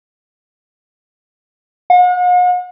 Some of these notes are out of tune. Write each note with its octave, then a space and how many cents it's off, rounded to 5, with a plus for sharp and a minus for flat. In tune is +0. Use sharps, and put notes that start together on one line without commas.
F#5 -45